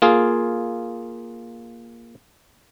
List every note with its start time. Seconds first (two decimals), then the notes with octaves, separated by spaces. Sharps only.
0.02 A#3 F4 G#4